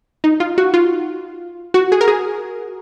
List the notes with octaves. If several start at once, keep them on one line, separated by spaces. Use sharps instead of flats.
D#4
F4
F#4
F4
F#4
G#4
A#4
G#4